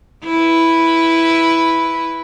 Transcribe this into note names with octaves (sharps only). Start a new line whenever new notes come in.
E4 B4